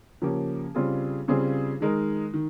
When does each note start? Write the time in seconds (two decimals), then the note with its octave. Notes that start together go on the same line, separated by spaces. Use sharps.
0.22 C#3 F3 A#3 C#4 G4
0.74 C#3 G3 C4 F4 G#4
1.28 C#3 G3 C4 F4 G#4
1.81 D#3 G#3 D#4 A#4
2.34 D#3